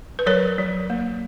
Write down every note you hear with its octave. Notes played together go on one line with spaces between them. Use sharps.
B4
F#3 A#4 C#5
F#3
A#3